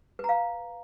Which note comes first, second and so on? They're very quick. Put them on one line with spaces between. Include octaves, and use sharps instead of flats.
B4 A#5 F5